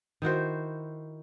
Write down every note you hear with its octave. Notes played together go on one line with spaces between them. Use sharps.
D#3 E4 F#4 C5